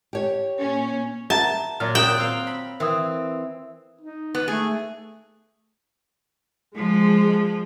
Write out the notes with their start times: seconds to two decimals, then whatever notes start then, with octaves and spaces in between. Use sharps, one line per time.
0.13 G4 C#5
0.60 A#2 C#4
1.30 E5 F#5 A5 A#5
1.80 A#2 F#3 F6
1.95 G5 D#6 F#6 E7
2.17 C4 F5
2.47 B5
2.80 E3 C4 A#4 D#6
4.01 D#4
4.35 B3
4.48 A3 G#4
6.76 F3 G#3